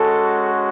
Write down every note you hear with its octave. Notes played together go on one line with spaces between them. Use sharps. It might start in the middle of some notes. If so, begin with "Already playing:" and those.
Already playing: G#3 C#4 F#4 A4